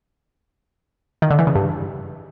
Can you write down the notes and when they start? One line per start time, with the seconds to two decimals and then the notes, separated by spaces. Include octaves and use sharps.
1.22 D#3
1.30 D3
1.39 E3
1.47 C#3
1.55 G2